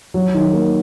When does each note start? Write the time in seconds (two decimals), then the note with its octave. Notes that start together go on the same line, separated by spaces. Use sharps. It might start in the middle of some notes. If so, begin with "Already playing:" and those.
0.14 F#3
0.34 D#3
0.53 A#3